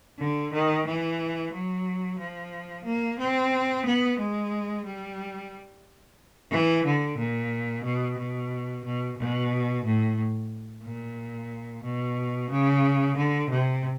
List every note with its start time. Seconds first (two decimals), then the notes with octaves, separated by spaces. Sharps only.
0.19 D3
0.52 D#3
0.86 E3
1.52 F#3
2.19 F3
2.85 A#3
3.19 C4
3.85 B3
4.19 G#3
4.85 G3
6.51 E3
6.85 D3
7.18 A#2
7.84 B2
8.18 B2
8.84 B2
9.17 B2
9.84 A2
10.83 A#2
11.84 B2
12.50 C#3
13.16 D3
13.50 C3